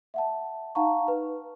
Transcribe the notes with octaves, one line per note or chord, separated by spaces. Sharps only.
E5 F#5 A5
D#4 F5 F#5 A5 A#5 C#6
B4